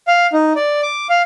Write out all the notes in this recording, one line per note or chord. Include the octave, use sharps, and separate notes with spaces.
F5
D#4
D5
D6
F5